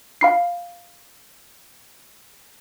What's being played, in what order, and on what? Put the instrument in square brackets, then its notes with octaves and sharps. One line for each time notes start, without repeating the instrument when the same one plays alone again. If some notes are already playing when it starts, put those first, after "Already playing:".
[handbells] F5 B5 C7